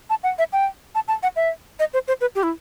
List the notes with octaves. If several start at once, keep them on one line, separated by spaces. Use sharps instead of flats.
A5
F#5
E5
G5
A5
A5
F#5
E5
D#5
C5
C5
B4
G4
E4